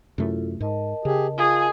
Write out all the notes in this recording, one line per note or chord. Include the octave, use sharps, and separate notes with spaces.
F#2 C3 A3 E4 F4 A4
G#2 A#4 D#5 A5
C#3 G4 G#4
F4 G#4